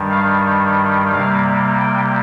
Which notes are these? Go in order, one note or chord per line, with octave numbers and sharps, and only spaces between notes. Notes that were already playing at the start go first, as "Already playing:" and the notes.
Already playing: G2 D#3 G3
F5
C3 G3 A#3 F5
G5